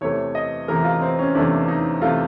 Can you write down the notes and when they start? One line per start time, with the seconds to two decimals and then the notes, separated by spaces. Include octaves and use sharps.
0.01 E2 C3 E3 A3 C#5
0.35 D#5
0.68 E2 C3 E3 A3 A#4
0.84 F4
1.01 C4
1.19 C#4
1.35 E2 C3 E3 A3 D4
1.68 D#4
2.01 C3 E3 A3 F4